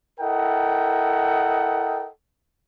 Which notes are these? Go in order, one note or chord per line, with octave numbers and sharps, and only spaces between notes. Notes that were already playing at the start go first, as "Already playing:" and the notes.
E4 A4 A#4 D#5 F#5 G5